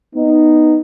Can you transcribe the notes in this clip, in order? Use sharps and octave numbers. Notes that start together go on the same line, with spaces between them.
B3 D#4